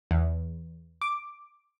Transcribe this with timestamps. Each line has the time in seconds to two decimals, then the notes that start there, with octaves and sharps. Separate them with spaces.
0.11 E2
1.01 D6